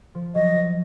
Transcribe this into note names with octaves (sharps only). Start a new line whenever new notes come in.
F3
F#3 D#5
F3